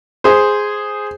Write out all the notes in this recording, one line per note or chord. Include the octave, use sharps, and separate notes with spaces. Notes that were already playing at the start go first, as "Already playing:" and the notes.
G#4 C5